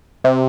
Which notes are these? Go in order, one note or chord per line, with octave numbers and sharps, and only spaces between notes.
C3